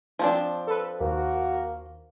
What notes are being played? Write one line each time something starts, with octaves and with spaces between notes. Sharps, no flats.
F3 C4 D4
A4 B4
D#2 A#3 F#4 A#4